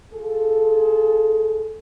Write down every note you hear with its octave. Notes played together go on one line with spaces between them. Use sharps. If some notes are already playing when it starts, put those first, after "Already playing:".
F4 G#4 A4